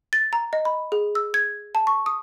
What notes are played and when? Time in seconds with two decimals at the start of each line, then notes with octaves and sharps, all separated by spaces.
0.13 A6
0.33 A#5
0.53 D#5
0.65 B5
0.92 G#4
1.15 E6
1.34 G#6
1.75 A5
1.87 C#6
2.06 D#6